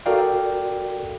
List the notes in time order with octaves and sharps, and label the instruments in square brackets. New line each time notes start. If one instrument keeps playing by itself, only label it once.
[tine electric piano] F#4 A4 A#4 D5 F5 G5